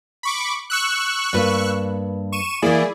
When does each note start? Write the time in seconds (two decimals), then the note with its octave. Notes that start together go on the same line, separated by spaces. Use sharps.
0.23 B5 C#6 D6
0.70 C#6 E6 F#6
1.33 G2 A#3 B4
2.32 C#6 D#7 E7
2.62 E3 A#3 E4 G#4 D5